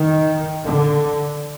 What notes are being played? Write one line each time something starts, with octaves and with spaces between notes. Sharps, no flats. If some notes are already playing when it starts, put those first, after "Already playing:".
Already playing: D#3
D3